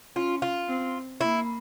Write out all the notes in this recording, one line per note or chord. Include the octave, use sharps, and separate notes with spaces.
C#4 F4
F4
C4
A#3 E4